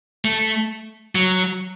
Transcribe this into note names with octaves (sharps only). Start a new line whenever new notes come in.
A3
F#3